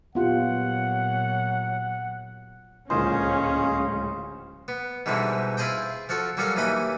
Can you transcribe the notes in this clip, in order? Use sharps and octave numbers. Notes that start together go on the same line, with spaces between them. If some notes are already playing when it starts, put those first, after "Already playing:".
A#2 F#3 B3 F4 G4 F#5
D1 C#2 A#2 C#4 G#4 C5 D#5 F5
B3
G#2 B2 D3 E3 G3 G#3
E4 F4 G#4 C5 D#5 G5
F3 F4 F#4 A4
F#3 G3 C#4 A4 A#4 F5
D#2 E3 C#4 D#5 B5 D#6